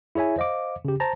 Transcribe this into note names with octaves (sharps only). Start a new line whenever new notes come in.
E4 G#4 C#5 E5 G#5
C5 D#5 F5 D6
C#3 G4
C5 A5 A#5